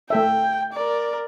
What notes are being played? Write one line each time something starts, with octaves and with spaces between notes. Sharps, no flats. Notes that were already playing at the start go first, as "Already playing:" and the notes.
A3 A4 E5 G5
A#4 D5